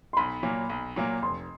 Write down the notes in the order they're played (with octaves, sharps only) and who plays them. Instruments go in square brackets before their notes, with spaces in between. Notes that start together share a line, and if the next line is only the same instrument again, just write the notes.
[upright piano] C6
[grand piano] B1 [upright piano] B5
[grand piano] A#2 F#3 A#3
B1
A#2 F#3 A#3
[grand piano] F1 [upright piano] C6